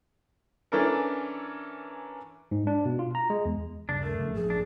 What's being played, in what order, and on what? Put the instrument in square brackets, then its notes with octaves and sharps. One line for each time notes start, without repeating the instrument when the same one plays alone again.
[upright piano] E3 C#4 D4 A4 A#4
[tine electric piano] G#2
D4
B2
F4
A#5
G#3
E2
[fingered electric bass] D#1 G2 C#3 [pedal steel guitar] D4
[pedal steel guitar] A3 [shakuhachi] A#4
[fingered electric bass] C#3 F3 C#4
[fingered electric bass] A1 G2 F3 [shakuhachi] G#4
[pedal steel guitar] D4